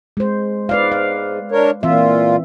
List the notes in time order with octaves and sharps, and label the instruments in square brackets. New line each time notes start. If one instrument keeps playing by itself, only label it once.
[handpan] G#3 C5
[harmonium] G#2 [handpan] B4 D5 F5
[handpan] F5
[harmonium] D4 A#4 C#5
[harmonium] A#2 F4 [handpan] E3 C4 E5